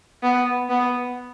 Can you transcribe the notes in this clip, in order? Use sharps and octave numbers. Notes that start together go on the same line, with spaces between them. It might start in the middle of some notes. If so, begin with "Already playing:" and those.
B3
B3